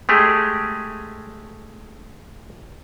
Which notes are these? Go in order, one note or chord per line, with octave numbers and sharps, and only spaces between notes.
G#3 A3 G4 G#4